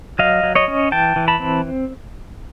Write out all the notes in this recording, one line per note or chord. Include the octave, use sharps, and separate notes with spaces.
F#3 D#5 F5
F#3
C#5 D#5
C#4
E3 G5 A5
E3
A5 B5
C4